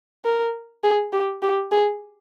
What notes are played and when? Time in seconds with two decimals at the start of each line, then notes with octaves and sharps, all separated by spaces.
0.25 A#4
0.84 G#4
1.13 G4
1.42 G4
1.71 G#4